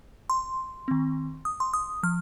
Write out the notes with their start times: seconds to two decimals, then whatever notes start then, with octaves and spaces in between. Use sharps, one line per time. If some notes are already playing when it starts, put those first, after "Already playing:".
0.30 C6
0.88 D#3 C4
1.45 D#6
1.60 C6
1.74 D#6
2.03 F3 F6